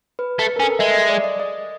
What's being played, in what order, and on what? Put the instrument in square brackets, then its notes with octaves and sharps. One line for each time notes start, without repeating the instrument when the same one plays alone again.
[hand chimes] B4
[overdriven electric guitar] A3
[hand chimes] B4
A#4
[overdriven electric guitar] C#4
[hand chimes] A4
A#4
[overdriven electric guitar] G#3 [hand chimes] E5
[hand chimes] D#5
D5
D#5
D#5